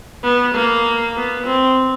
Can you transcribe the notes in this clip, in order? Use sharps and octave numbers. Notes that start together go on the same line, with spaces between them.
B3
A#3
B3
C4